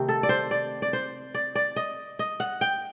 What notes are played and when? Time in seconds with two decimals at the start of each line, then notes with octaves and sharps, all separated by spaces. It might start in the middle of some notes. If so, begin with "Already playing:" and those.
Already playing: C3 D#3 A3 C4 G4
0.09 A4
0.23 D5
0.29 C5
0.51 D5
0.82 D5
0.93 C5
1.34 D5
1.55 D5
1.76 D#5
2.19 D#5
2.40 F#5
2.61 G5